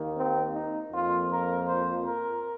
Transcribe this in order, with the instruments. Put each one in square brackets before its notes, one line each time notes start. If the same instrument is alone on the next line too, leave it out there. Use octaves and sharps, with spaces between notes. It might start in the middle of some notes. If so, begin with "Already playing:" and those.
Already playing: [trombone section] D#2 D#3 A#3
C4
D#4
F2 F3 A#3 F4
A#4
C5
A#4